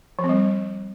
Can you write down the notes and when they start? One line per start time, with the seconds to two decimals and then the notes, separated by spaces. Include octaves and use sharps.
0.19 F3
0.24 C4
0.29 G3